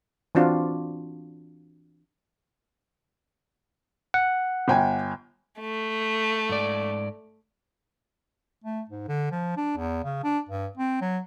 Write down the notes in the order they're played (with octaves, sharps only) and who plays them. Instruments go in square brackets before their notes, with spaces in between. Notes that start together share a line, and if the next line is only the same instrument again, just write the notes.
[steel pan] E3 C4 D4 F4 F#4
[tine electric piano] F#5
[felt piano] G1 G5 G#5
[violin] A3
[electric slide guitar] G#2 D5
[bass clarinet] A3
G#2
D3
F3
D4
E2
C#3
D4
G2
C4
F#3